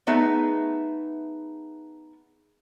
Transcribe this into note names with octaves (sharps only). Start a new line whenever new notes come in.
A3 B3 D#4 G#4 B4 E5